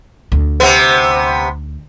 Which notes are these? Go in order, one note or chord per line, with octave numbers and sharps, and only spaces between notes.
D2
C3 B3